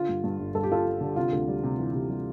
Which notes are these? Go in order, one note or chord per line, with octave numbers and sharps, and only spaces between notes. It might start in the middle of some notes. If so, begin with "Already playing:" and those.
Already playing: D3 F4
G2
G2
G1
G1 A4
G4
G3 F4 A4
G3
D3
C3 F4
D2
G3
C3
E3
C3
G3